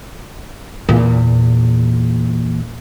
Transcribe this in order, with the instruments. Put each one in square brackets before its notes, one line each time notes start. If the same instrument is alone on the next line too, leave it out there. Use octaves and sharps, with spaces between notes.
[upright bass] E2 A#2